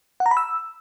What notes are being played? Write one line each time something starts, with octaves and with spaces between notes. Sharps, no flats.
F#5
A#5
B5
E6